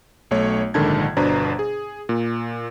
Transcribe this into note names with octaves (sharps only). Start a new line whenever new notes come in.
B1 A3 C#5
A#1 G#2 D3 D#3 A5 G#6
G1 B2 D4 B4 C5 A#5
G#4
A#2